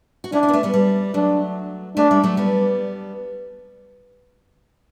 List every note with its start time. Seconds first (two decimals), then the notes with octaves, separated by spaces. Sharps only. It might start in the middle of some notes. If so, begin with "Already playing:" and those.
0.24 F#4
0.32 C#4 D4 E4
0.43 C#4 E4
0.49 B3
0.53 A3 C#4
0.63 G3 B3
0.74 G3
1.14 F#3 A3 D4
1.96 A3 C#4 D4
2.11 G3
2.23 F#3 A3
2.37 G3 B3